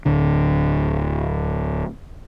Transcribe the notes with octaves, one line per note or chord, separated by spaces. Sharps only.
D1 D3